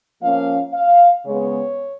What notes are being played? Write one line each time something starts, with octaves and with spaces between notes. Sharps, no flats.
F3 A#3 C#4 F5
F5
C#3 G#3 B3 C#5